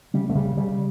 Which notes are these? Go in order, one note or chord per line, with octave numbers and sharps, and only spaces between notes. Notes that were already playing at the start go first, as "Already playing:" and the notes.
C#3 G3
A3
C#3 G3
C#3 G3